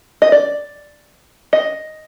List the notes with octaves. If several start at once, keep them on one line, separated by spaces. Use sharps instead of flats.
D#5
D5
D#5